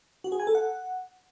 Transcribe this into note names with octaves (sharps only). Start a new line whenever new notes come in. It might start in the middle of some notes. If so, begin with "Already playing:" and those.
F#4
G#4
G#5
A4
F#5